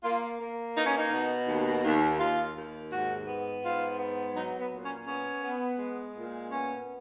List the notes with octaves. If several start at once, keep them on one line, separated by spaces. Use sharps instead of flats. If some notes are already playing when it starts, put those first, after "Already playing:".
A#3 F4
A#3
B2 D#4
C#4
D#4
B2
D#2
D#2
D#2 F4
D#2
G#2 F#4
B3
G#2 F4
B3
F#3 D#4
B3
A#2
C#4
B3 C#4
B3
G#3
A#2
B3 C#4